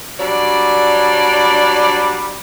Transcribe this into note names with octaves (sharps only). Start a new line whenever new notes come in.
F#3 G3 D4 D5